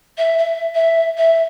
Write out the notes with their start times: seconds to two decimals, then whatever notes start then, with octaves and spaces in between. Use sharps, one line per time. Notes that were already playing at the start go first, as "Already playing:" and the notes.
0.18 E5
0.38 E5
0.75 E5
1.17 E5